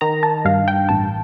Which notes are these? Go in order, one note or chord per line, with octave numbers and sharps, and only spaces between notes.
D#3 A#5
A5
G2 F5
G5
A1 A5